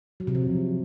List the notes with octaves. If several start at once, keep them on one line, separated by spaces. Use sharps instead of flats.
F#3
C3
F3